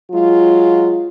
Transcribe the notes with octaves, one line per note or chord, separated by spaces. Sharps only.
F#3 G#3 F4